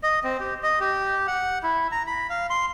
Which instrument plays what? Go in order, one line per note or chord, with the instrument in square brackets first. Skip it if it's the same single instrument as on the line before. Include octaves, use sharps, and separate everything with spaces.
[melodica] D#5
C4
G4
D#5
G4
F#5
E4
A#5
B5
F5
C6